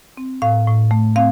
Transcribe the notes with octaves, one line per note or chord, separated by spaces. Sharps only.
C4
A2 F5
A2
A3
C4 F5